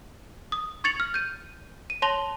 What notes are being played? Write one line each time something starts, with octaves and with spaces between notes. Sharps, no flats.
D#6
C#6 G#6 A6 C#7 F7 F#7
F6
G6 D#7
D#7
C#5 A5 C6 A#6 F7 G7